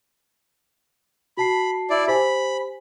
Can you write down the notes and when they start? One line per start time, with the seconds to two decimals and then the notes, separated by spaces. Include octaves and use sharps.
1.37 F#4 A5 B5 C7
1.90 E4 D5
2.08 G4 C5 G#5 B5